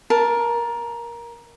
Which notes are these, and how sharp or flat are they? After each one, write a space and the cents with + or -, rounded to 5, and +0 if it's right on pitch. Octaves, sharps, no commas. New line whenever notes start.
A#4 +15 A5 +0